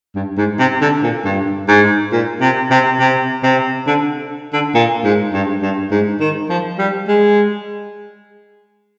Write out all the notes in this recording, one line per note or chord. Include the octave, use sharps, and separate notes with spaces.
G2
G#2
C3
D3
A#2
G2
G#2
A#2
C3
C3
C3
C3
D3
D3
A#2
G#2
G2
G2
G#2
D#3
F3
G3
G#3